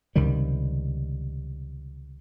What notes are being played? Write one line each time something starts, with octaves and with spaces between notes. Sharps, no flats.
C#2 C3 D#3 G3